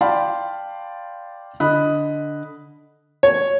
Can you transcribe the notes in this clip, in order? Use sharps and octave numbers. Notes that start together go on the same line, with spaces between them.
D5 F5 G5 A5 B5 C6
D3 D#5 B5 D#6 F#6
C#5